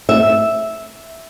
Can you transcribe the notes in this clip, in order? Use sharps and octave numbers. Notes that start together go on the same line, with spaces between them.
E5